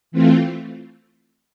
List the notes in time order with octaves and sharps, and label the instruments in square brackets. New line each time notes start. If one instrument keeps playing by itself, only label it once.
[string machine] E3 A3 C4 F4